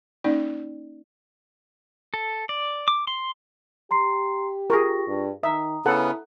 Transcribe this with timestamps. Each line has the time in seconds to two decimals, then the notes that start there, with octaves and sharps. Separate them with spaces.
0.24 A#3 C#4 D#4 D5
2.14 A4
2.49 D5
2.88 D6
3.07 C6
3.91 G4 A#5 C6 C7
4.70 F4 G#4 A#4 C#6 A#6
5.08 G2
5.43 D#3 E5 A#5 D#6
5.86 C#3 B3 C#4 E4 A4 F#5